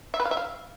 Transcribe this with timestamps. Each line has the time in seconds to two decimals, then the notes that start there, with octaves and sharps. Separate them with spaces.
0.14 E5
0.20 B4
0.25 F5
0.31 E5
0.37 F5